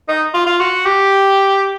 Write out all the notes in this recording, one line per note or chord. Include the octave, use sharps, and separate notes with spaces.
D#4
F4
F4
F#4
G4